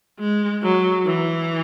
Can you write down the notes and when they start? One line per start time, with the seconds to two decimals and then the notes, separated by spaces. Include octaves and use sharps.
0.20 G#3
0.63 F#3
1.06 E3